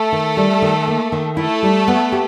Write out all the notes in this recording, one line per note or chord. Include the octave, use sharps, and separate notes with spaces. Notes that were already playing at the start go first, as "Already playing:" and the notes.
Already playing: A3 A4
D#3
G3
D#3
A#3
D#3
A3 E4 A4
G3
B3
G4